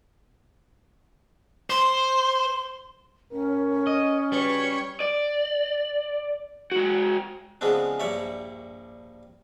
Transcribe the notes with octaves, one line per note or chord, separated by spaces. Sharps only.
C5 C6
A2 C#4 A#4
D#5
C#3 G3 F#4 B4 C#5
D5
G#3 F#4
C#3 F3 G#3 B3 C4 D4
A#1 G2 G3 C#5 D5 E5